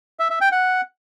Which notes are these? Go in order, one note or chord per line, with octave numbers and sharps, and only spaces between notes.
E5
E5
G5
F#5